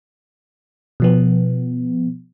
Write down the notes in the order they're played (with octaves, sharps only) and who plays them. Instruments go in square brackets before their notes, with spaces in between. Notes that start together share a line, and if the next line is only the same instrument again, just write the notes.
[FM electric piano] B2 F3 B3